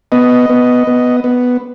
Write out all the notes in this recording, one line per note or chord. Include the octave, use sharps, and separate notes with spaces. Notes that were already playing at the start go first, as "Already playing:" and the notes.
B3 D#5
B3
B3
B3